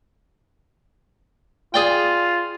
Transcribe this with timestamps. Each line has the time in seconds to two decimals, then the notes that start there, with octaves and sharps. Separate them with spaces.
1.74 F4 G#4 D5 G5